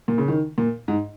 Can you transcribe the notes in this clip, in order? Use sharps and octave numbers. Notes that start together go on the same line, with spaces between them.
A#2
C#3
D#3
A#2
G#2